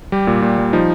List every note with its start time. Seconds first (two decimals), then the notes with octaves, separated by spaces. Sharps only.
0.12 G3 G4
0.27 A#2
0.42 A#2
0.58 G3
0.73 F3 D#4